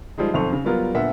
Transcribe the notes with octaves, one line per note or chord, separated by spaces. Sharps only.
F3 G3 G#3 D#4
B1 F2 A4 C5 C#6 F7
C#3
F#3 G3 B3 F4 A#4
D2 A#2 B3 A#4 E5 F#5